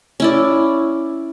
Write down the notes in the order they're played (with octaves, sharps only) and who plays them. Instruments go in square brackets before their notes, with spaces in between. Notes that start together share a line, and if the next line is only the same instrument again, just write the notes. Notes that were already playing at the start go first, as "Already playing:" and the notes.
[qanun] C#4 E4 D5